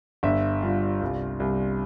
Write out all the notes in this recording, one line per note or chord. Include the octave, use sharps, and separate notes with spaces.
G1 E5
G2 F4 F5
C2
C2